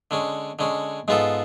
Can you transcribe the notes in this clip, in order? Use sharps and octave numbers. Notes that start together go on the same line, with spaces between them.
D3 G#3 C#4
D3 G#3 C#4
G#2 G#3 B3 F4 A4